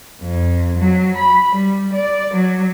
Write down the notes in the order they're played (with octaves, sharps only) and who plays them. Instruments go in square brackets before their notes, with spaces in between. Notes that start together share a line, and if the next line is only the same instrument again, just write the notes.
[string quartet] F2
F#3
B5
G3
D5
F#3